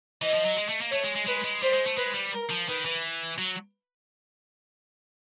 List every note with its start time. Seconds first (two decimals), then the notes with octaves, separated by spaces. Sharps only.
0.22 E3 D#5
0.34 F3
0.45 F#3
0.57 G#3
0.68 A3
0.81 A#3
0.91 A3 C#5
1.04 G#3
1.15 G#3
1.26 G#3 B4
1.44 G#3
1.62 G3 C5
1.74 G#3
1.86 A3
1.97 G#3 B4
2.15 G3
2.33 A#4
2.50 F3
2.68 D#3 B4
2.85 E3
3.38 F#3